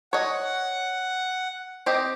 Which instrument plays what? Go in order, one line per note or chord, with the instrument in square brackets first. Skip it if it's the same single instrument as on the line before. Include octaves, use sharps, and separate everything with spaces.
[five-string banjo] C#5 D#5 [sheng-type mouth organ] F#5
[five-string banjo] C4 G4 D#5